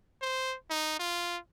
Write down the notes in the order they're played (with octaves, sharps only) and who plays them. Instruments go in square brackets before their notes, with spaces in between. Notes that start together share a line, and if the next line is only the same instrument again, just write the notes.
[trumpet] C5
D#4
F4